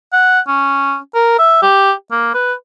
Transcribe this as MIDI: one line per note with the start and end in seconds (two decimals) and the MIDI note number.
0.13 0.40 78
0.48 0.97 61
1.15 1.39 70
1.39 1.58 76
1.62 1.92 67
2.11 2.30 58
2.34 2.53 71